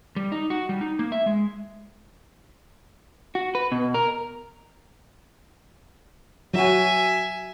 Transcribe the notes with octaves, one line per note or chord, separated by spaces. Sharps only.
G3
D#4
F#4
G3
D#4
A#3
E5
G#3
F#4
B4
B2
A#4
F#3 F#4 E5 G#5